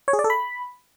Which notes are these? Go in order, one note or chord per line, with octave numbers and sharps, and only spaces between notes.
C#5
G#4
D5
A4
B5